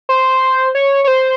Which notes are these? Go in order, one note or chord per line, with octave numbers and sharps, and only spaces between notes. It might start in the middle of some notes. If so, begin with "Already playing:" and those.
C5
C#5
C#5
C5